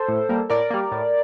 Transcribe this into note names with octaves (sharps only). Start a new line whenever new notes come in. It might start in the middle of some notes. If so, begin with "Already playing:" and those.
Already playing: A4 C5
A2
G3 A#3
A2 A#4 D5
G3 A#3
A2